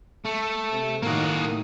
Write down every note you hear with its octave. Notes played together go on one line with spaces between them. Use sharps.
A3
C3
A2 D#3 A#3 F#4 D#6